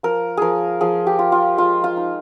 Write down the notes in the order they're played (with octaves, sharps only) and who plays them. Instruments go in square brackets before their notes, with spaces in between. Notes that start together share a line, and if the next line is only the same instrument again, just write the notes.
[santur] F3 A#4
F3 G#4 A#4
F3 G#4
G4
F4
F4
G#3 F4
F4
D#4